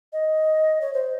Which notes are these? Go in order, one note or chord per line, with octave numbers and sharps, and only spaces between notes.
D#5
C#5
C5